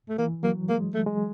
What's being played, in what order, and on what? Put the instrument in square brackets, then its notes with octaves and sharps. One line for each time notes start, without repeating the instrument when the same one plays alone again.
[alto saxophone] A3
[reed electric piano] E3 [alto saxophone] A#3
[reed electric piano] F#3 [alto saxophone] A#3
[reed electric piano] G#3 [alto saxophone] A#3
[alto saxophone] A3
[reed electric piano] G#3